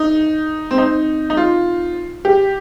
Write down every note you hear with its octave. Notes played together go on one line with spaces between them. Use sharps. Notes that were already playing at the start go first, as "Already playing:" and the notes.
Already playing: D#4
C4
D#4
D#4
F4
G4